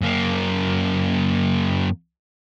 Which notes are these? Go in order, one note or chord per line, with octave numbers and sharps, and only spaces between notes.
F#2 A#3